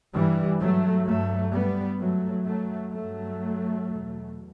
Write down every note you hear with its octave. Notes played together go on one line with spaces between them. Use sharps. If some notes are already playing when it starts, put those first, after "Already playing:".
G2 E3 G3
F#3 A3
G2 F#3 A3
G3 B3
F#2 F#3 A3
F#3 A3
G2 F#3 A3
E2 B2